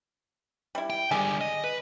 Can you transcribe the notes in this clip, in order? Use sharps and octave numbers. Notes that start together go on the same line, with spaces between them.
G3 E4
G5
D3 G3 G#4
D#5
B4